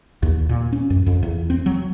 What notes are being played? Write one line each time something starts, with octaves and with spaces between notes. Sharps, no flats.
D#2
A#2
C#4
F#2
F2
E2
C4
F#3